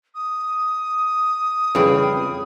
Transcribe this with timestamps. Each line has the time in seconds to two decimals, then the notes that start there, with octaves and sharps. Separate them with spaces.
0.15 D#6
1.75 F2 C#3 E3 G3 G#4 G5